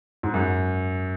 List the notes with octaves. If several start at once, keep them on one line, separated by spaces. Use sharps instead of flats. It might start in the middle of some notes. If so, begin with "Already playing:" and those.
G#2
F#2